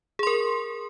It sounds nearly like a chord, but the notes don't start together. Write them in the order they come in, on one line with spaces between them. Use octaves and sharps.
G#4 C6 A#4